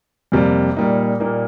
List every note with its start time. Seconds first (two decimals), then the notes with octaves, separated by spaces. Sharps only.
0.32 F2 C3 G3 A#3
0.77 A#2 G3 A#3 D#4
1.20 A#2 G3 A#3 D#4